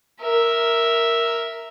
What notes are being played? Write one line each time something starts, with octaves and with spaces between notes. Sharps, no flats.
A#4 E5